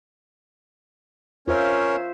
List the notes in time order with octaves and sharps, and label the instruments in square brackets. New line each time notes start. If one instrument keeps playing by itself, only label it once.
[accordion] C#4 A#4 C#5 [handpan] F4 C5 E5